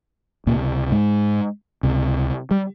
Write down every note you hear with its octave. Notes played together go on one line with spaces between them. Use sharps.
C#2 A#2 C3 A#3
G#2 G#3
C#2 C3
G3